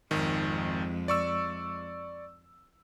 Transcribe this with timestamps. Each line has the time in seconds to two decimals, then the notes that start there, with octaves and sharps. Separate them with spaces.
0.11 G#1 F2 D#3 G#3
1.08 D5 C#6 E6